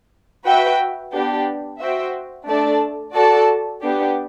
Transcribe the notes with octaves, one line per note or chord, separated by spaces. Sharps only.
F#4 B4 E5 G5
B3 D4 G4
F#4 C5 E5 G5
A3 D4 A4 D5 A5
F#4 A4 D5 A5
B3 D4 G4